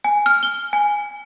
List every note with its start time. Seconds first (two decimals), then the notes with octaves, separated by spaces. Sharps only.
0.04 G#5
0.26 F6
0.43 G7
0.73 G#5